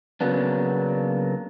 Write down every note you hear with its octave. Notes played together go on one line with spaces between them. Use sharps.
C#3 F#3 A#3 B3 D4